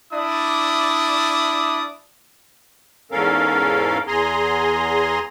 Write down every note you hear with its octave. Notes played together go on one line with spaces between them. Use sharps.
D4 E4 D5 D#6
E2 G#2 C#4 A4 A#4 F5
E2 G#4 G#5 A#5 C6